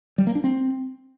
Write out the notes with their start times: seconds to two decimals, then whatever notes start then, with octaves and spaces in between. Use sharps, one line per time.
0.18 G3
0.27 A#3
0.35 D4
0.44 C4